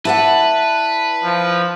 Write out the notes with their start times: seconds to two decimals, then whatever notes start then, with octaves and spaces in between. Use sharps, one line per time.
0.05 E4 B4 D5 F#5 A5
1.24 F3